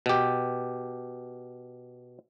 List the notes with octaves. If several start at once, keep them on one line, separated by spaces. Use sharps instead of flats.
B2 G4